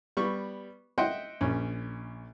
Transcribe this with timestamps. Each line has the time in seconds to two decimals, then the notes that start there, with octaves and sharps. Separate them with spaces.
0.17 G3 B3 C#6
0.98 D#5 E5 F#5 G5 C6
1.41 A#1 C#4